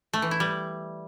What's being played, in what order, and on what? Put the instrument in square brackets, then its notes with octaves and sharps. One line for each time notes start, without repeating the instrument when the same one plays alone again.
[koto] A3
E3
E4
G3